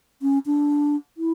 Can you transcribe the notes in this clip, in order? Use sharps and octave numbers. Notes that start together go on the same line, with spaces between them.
C#4
D4
E4